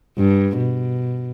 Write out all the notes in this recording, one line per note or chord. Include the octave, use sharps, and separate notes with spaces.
G2
B2